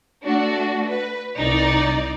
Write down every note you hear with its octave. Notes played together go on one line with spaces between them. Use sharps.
A3 D4 F#4
B4
C2 D#4 D5